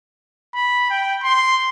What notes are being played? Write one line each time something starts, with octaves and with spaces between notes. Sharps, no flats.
B5
G5
C6